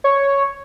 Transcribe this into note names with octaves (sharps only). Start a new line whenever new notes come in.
C#5